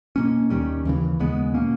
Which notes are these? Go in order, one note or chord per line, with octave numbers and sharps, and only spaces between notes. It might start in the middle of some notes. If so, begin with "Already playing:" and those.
B2 A#3 C#4
D#2 D#3 G3 C#4
D#2 C#3 E3
D#2 C#3 G#3 B3
B2 A#3 C#4